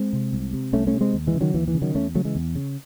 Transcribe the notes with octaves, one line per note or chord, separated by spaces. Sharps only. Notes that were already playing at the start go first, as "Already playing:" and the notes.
Already playing: G#3 C4
C3
C2
C3
C2 A3 C#4
A3 C#4
C3
G#3 C4
D#2
E3 G#3
C#3
D#3 F#3
D#2 E3
E3
C#3
D#3 F#3
E2 A3 C#4
C#3 F#3 A3
E3 G#3
E2
C#3